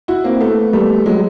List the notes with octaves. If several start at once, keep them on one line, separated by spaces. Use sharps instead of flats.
E4 F#4
A#3 C4
A3 B3
G3 A3
F#3 G#3